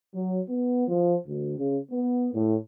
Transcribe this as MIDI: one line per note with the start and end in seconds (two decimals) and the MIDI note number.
0.14 0.40 54
0.49 0.84 59
0.88 1.14 53
1.26 1.53 38
1.57 1.78 49
1.90 2.28 59
2.33 2.56 45